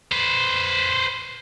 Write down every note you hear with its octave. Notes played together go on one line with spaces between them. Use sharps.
B4 C5